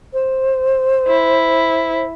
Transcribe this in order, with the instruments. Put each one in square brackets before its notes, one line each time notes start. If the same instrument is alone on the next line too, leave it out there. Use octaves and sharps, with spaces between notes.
[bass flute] C5
[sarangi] E4